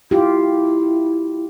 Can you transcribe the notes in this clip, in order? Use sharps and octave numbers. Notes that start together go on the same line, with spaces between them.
E4 F4 G4